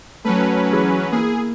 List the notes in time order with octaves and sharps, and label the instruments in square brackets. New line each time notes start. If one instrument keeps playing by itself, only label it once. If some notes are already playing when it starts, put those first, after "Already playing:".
[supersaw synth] F#3 C#4 B4 [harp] A3
[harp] E3 E4 G#4
[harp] A#3 E4 [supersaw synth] G#4